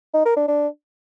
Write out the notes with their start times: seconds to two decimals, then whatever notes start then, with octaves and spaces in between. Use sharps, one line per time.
0.14 D#4
0.25 A#4
0.37 D4
0.48 D4